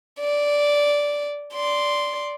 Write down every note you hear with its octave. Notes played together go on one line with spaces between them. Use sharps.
D5
D5 C6